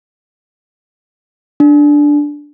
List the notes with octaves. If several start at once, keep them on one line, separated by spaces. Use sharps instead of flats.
D4